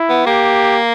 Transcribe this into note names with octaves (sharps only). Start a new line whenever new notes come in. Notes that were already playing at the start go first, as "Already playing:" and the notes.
Already playing: E4
B3
A#3 G4